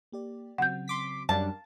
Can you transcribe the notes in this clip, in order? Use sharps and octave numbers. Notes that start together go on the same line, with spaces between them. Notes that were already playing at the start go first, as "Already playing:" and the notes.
A#3 G4 D5
C#3 F#3 C4 F#5 G6
C6 D6 B6
F#2 G3 D4 A#4 F5 A5